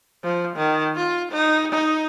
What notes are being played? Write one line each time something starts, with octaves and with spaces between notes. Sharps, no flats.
F3
D#3
F4
D#4
D#4